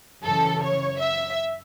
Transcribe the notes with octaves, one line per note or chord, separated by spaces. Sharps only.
F#2 C#3 E3 A4
C#5
E5